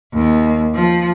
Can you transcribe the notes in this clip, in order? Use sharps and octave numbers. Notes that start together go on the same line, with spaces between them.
D#2
F3